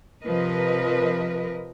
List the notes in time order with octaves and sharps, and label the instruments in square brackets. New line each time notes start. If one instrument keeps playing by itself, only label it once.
[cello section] C3 F3 A#4 B4 D#5